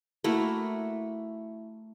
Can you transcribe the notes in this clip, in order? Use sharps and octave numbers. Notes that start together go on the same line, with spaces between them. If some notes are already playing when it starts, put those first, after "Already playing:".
A3 A#3 E4 F#4